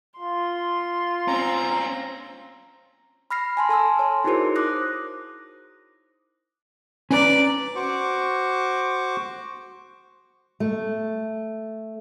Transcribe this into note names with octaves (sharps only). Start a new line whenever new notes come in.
F4 C6
C4 C#4 A#5
B5 F6 A#6 C7
G#5 A5 C6
A4 G#5 A5 E6
C#5 C6
D#4 E4 F#4 G#4 A#4 C5
D6 D#6 F#6 A#6
C#4 B4 D5 A#5
F#4 C5 C#6 D6
A3